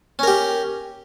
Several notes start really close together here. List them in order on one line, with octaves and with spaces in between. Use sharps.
C#4 A#4 G4